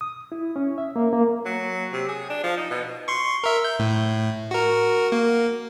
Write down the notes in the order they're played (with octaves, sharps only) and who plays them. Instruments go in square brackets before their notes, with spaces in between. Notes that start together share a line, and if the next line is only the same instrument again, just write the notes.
[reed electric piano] D#6
E4
C#4
E5
A#3
A#3
[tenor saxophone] F#3
C3
G#4
D4
F3
D#4
B2
[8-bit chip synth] C6 C#6
A#4 E5
G6
A2
F#4 A#4
A#3